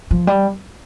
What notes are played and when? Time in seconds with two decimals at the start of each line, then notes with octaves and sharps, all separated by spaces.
0.11 F3
0.27 G3